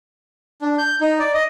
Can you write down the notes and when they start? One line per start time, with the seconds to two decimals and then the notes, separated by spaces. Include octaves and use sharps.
0.62 D4
0.78 G6
1.01 D#4
1.19 D5
1.34 D#5